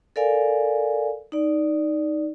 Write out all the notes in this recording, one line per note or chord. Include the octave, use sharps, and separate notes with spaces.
A4 A#4 D5 F5 G#5
D#4 D5